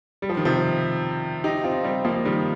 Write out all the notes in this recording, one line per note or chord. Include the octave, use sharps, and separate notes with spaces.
G3
F3
D#3
C3 F3
D#4 G4
C4 F4
G3 C4
F3 A#3
D#3 G3